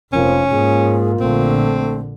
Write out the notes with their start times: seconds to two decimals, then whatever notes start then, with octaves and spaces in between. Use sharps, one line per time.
0.13 F1 F3 A#3 C4 C#4 A#4
0.51 G#2 A#3 F4 G#4
1.20 A#1 D3 A3 C4